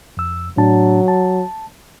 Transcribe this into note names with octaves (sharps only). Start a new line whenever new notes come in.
F2 E6
A2 F#3 D4 A5
A5